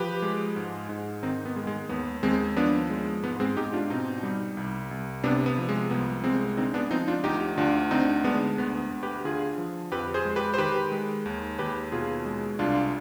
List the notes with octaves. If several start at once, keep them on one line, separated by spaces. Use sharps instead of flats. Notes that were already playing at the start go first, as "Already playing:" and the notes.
Already playing: F3 G4 B4
G#3
G#2
G#2
D#3 C4 D#4
B3
G#3
G#3
D#2 B3
D#2 G#3 C4
F3 B3 D4
G#3
G#2 B3
G#3 C4
G#2 D#4 G4
D4 F4
B2 C4 D#4
G3
C2
C2
C3 B3 D4
B3
F3
G#3
C2 B3
G#3 C4
D3 C4 D#4
B3 D4
F3 C4 D#4
D4 F4
D2 D#4 G4
D2 D4 F4
D3 C4 D#4
G#3 B3 D4
D2 B3
D2
G4 B4
D3 F4 G#4
F3
F2 G4 B4
G#4 C5
G#3
G4 B4
C5
D#3 G4 B4
G#3
D#2
D#2 G4 B4
B2 F4 G#4
G#3
C2 D4 F4